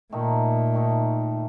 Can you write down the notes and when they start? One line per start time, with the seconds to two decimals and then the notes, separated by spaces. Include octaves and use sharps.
0.12 A#2 D#3 A3 D#4
0.74 D#3 A3 D#4